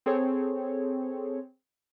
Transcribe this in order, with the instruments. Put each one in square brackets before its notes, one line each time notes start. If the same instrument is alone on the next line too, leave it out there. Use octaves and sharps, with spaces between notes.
[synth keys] C4 G#4 A4 C#5